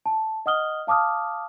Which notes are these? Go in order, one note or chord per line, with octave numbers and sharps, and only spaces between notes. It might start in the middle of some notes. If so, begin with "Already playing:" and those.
A5
D#5 F#5 D#6 F6 G7
F5 A5 D6 D#6 F6